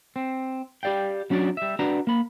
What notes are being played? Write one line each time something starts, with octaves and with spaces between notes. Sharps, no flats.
C4
G4 A4 D5 F5 G5
F#3 C#4 D4 F#4 D5
G3 E5
D4 F#4 B4 D5 A#5
A#3 B5